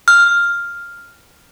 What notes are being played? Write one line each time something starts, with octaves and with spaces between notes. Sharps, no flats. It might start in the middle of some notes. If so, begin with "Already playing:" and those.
F6